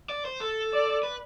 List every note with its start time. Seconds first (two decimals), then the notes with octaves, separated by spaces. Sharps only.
0.10 D5
0.25 C5
0.40 A4
0.73 D5
1.03 B4